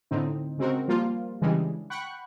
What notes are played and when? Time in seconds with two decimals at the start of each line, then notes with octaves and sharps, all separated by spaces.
0.11 A2 D3 C4 D#4
0.58 C#3 G#3 C4 F#4 A#4
0.88 F3 G3 A#3 F4
1.42 C#3 E3 G3 G#3 D4
1.90 F#5 G5 B5 C#6 F#6